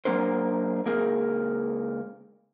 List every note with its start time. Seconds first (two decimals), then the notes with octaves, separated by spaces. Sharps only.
0.05 F#3 A#3 D4 A#4 C5
0.86 C#2 A#3 G#4 A#4